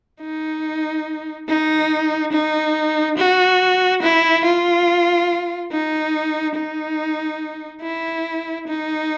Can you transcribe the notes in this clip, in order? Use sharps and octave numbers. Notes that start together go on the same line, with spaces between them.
D#4
D#4
D#4
F#4
E4
F4
D#4
D#4
E4
D#4